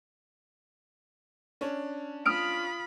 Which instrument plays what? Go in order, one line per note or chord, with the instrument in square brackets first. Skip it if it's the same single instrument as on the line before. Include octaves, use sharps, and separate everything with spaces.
[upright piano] C#4 D4 C#5
[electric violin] F4 B5 [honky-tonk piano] D#6 F6 D7